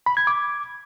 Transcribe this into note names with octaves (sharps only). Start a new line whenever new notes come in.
B5
G#6
D6